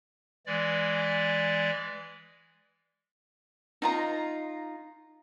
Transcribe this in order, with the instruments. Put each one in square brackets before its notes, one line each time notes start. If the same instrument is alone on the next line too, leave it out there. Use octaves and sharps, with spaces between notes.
[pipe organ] E3 G#3 D5
[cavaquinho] D#4 F4 A#5